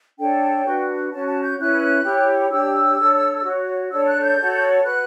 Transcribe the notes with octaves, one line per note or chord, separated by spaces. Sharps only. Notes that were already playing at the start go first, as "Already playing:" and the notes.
D4 A4 C#5 G5
D4 F#4 B4
C#4 F#4 C#5 A5
A5
G6
C#4 E4 B4 F#6
E4 G4 C#5
D4 G4 C#5 E6
D4 A4 C#5
F#4 C#5
D4 A4 C#5 E6
F#6
G6
F#4 A4 C#5
F#4 B4 F#6